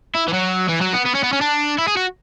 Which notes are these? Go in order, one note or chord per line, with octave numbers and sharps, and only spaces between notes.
E4
E3
F#3
E3
F#3
B3
B3
C#4
B3
C#4
D4
E4
G#4
F#4